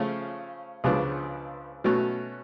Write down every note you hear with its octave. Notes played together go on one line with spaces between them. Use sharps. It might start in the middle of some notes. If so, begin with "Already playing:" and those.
Already playing: C#3 F3 A3 C#4
C#2 C#3 F3 B3 D4
B2 F#3 A3 C#4